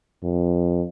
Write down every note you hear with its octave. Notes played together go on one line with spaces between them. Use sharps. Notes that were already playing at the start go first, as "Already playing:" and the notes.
F2